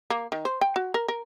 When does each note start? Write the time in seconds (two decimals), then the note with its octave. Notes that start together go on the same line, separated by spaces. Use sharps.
0.10 A#3
0.32 D#3
0.45 C5
0.61 G5
0.76 F#4
0.94 A#4
1.08 A#4